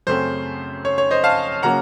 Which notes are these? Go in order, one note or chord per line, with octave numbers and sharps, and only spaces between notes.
F#2 C#3 A3 C4 C5
C#5
C#5
C5 D#5
F5 A5
C#3 F#3 A#3 F#5 A#5